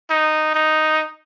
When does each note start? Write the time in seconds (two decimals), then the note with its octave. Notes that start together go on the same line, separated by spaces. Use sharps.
0.10 D#4
0.55 D#4